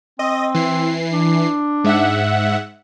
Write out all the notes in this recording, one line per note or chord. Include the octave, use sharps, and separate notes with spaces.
C4 D#5
E3 C7
D4
G#2 E5 F#5